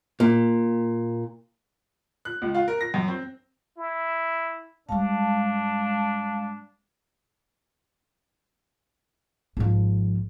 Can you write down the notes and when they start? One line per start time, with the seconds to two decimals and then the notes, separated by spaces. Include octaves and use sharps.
0.20 A#2
2.25 F#6
2.42 C#2
2.55 F4
2.68 A#4
2.81 A#6
2.94 F#2
3.08 C4
3.78 E4
4.89 G#2 G3 G#3 D4 F5 A5
9.57 G#1 F3